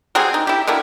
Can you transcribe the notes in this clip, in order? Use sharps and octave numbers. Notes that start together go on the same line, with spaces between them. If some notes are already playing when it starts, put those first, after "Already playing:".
F#3 G3 C4 G#4
D#4
E4 G4
B2 D3 A#3 E4